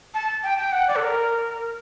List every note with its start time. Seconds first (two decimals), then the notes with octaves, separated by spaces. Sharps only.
0.14 A5
0.43 G5
0.58 G5
0.72 F#5
0.88 D5
0.96 A4
1.02 A#4